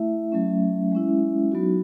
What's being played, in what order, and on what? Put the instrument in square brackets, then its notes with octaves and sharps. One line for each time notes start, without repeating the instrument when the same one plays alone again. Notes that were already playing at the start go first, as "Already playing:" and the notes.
Already playing: [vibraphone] A3 E4 E5
F#3 A3 C#4
G#3 C#4 E4
F#3 B3 D#4 F#4